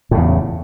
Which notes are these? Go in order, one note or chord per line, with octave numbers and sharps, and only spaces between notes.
E2 A2 C#3